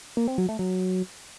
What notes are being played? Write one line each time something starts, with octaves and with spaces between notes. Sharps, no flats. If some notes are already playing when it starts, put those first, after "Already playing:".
A#3
C4
F#3
A3
F#3